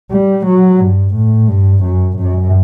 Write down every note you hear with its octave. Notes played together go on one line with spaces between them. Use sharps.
G3
F#3
G2
A2
G2
F#2
F#2